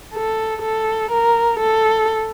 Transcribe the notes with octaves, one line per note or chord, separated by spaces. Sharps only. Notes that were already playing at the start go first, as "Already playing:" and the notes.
A4
A4
A#4
A4